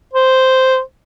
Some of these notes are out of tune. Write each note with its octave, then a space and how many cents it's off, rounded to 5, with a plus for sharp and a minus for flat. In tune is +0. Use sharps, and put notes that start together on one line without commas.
C5 -5